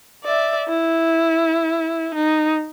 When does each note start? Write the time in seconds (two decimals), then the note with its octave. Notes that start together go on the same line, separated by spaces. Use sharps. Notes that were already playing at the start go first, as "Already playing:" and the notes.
0.24 D5 E5
0.68 E4
2.15 D#4